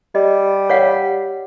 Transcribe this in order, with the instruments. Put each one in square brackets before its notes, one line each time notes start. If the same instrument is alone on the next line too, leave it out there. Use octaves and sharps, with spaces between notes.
[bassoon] G3 [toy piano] D#5
[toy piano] C#5 F5 F#5